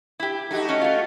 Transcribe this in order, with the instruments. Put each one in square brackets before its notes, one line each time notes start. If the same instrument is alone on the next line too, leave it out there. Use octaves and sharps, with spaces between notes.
[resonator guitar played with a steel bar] E4 G4
[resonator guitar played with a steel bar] A3 [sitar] D#4 F#4 G4
[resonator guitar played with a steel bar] A3 C#4
A3 F4